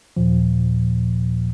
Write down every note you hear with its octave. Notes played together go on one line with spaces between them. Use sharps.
D#2 A#2 F3